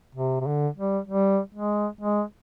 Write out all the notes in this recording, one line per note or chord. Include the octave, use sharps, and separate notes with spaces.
C3
C3
D3
G3
G3
G#3
G#3